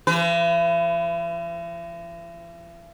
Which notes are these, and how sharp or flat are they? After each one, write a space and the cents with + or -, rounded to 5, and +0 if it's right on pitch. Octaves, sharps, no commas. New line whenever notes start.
E3 +45 B4 +30